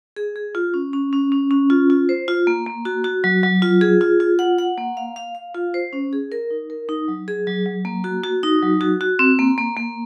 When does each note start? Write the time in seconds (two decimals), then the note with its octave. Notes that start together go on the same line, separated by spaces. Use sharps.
0.17 G#4
0.36 G#4
0.55 F4
0.74 C#4
0.93 C#4
1.13 C#4
1.32 C#4
1.51 C#4
1.70 F4
1.90 F4
2.09 C5
2.28 F4
2.47 A#3
2.66 A#3
2.85 F#4
3.04 F#4
3.24 F#3
3.43 F#3
3.62 F4
3.81 G#4
4.01 F4
4.20 F4
4.39 F#5
4.58 F#5
4.77 A#3
4.97 F5
5.16 F5
5.35 F5
5.55 F4
5.74 C5
5.93 C#4
6.13 G#4
6.32 A#4
6.51 D#4
6.70 A#4
6.89 D#4
7.08 F#3
7.28 G#4
7.47 F#3
7.66 F#3
7.85 A#3
8.04 F#4
8.24 F#4
8.43 D#4
8.63 F#3
8.81 F#4
9.01 F#4
9.19 C4
9.39 A#3
9.58 A#3
9.77 A#3